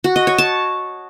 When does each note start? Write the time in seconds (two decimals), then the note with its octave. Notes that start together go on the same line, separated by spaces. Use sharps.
0.04 F#4
0.16 D#5
0.27 C#5
0.38 A5